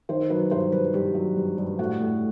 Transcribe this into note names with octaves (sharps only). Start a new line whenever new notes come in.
D#3 C5
F#3 B4
G2 C5
G2 B4
G2 G4
F#3
G2
G2
A2 F#4
A2